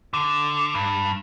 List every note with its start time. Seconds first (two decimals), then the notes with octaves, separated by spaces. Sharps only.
0.14 D3
0.75 G2